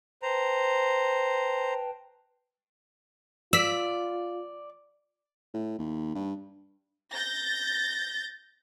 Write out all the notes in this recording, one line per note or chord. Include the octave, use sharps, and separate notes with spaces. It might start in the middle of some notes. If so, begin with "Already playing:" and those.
B4 C5 G5 A5 A#5
F4 D5 E6 B6
A2
D#2
G2
G6 A6 A#6